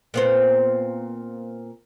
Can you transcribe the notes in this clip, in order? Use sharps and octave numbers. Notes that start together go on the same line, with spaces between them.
A#2 B3 C4